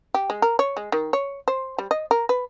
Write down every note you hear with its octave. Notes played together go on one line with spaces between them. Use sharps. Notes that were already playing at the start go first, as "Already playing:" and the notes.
G4
G#3
A#4
C#5
G#3
D#3
C#5
C5
G3
D#5
A#4
B4